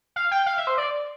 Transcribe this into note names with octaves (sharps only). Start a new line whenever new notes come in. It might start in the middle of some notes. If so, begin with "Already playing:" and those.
F5
G5
F5
E5
C5
D5